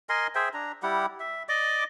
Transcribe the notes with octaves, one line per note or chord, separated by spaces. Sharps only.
A#4 D#5 G#5 C6
G#4 C5 E5 G5
D4 A#5
G3 E4 G4 F#5
E5
D5 D#5 D6